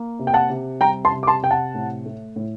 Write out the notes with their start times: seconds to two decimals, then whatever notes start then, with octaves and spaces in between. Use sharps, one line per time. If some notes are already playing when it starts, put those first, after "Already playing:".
Already playing: A#3
0.19 C3
0.27 G5
0.34 F#5 A5
0.50 C3
0.80 G3 G5 A#5
1.05 A5 C6
1.12 C3
1.23 D6
1.27 A5 C6
1.42 C3 G5
1.51 F#5 A5
1.75 A2
2.06 A3
2.36 A2